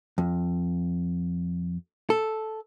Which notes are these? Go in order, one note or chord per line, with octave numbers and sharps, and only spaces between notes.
F2
A4